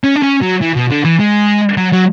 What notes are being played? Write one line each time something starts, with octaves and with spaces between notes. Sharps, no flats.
C#4
D4
C#4
F#3
E3
B2
D3
E3
G#3
F#3
F#3